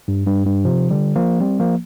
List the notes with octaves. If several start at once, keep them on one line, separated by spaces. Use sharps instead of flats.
G2
G2
G2
C3 F3
D3 G3
F3 A#3
G3 C4
F3 A#3